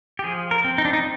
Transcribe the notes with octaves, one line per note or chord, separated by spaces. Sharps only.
G4
F3 G#4
A#4
C4
D#4
D4
D#4